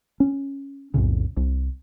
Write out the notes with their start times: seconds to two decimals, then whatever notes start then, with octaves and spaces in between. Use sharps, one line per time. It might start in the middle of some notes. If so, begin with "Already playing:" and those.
0.20 C#4
0.94 B1 F2 A2 C#3
1.37 C2